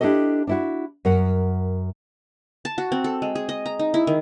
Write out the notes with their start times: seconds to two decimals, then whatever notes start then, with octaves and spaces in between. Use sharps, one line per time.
0.01 D4 E4 G4 A4 D#5
0.47 D4 E4 F#4
1.05 F#2 A#4 F#5
2.65 A5
2.78 F#4
2.92 C4
3.04 A4
3.22 G#3
3.35 G#4
3.49 D#5
3.66 A#5
3.79 D#4
3.94 E4
4.07 D#3